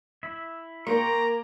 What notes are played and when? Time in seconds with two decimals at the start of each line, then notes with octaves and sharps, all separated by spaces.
0.23 E4 E5
0.87 A#3 G5 A#5 C6 C#6